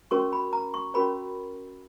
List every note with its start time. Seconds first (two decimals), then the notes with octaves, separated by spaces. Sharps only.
0.11 C#4 F#4 A#4 C#5 C#6
0.33 B5
0.53 A#5
0.74 C#6
0.94 C#4 F#4 A#4 C#5 B5